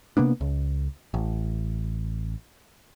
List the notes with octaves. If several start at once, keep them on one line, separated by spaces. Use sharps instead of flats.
C3 A#3 B3 D4
C#2
A1